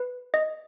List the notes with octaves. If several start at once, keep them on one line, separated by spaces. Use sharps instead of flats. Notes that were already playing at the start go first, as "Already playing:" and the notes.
Already playing: B4
D#5